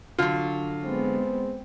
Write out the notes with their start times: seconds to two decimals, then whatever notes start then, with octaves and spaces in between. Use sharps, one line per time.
0.18 D3 F#3 F4
0.84 G#3 B3 C4